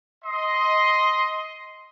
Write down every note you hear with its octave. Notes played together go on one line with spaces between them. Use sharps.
D#5 C6